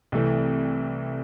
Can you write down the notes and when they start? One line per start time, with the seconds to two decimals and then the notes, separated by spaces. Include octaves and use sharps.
0.12 C2 C3 E3 A3